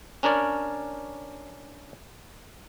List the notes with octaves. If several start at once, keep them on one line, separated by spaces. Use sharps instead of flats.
C#4 D4 A#4 C#5 D5